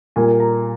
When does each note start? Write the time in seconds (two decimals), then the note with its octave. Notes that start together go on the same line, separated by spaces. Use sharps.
0.16 A#2 G3 A#3 G#5
0.40 A#5